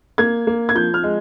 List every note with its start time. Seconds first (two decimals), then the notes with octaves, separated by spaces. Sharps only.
0.18 A#3 G#6
0.47 A#3
0.69 G#6
0.75 F3 G6
0.94 F6
1.03 G#3